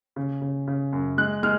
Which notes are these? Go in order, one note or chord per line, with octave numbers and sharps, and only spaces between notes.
C#3
C#3
C#3
F#2
G#3 F#6
G#3 F6